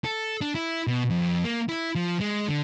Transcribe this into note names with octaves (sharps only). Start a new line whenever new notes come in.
A4
D4
E4
B2
F2
A#3
E4
F3
G#3
D3